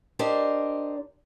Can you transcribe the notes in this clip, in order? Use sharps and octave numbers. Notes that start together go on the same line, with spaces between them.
D4 G4 A#4 C5 D5 D#5